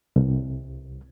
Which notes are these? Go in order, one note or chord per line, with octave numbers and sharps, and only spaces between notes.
C2